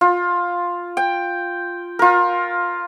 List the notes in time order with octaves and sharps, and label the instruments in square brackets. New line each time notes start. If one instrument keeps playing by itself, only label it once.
[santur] F4
G5
F4 A#4